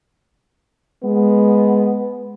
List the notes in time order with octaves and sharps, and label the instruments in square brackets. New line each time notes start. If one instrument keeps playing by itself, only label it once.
[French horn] G#3 [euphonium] B3